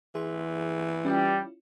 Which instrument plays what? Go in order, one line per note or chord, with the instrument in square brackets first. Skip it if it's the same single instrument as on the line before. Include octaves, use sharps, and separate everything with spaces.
[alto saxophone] E3 [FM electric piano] G#4 C6
[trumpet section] G3 [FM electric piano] C#4 E4 F4